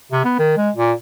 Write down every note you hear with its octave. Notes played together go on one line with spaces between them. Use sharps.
C3
B3
D#3
G#3
A#2